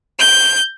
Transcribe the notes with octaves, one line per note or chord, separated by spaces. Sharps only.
G6